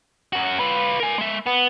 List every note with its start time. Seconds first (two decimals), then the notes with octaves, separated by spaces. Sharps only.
0.33 F#2 F#4
0.59 F4 B4
1.00 A#4 G#5
1.18 G#3 E5
1.46 B3